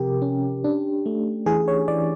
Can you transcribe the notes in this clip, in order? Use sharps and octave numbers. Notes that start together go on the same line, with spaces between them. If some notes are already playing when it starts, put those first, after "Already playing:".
Already playing: C3 F3 G4 A#4
C#4
D4
A3
E3 G#4
C#5
E3 D5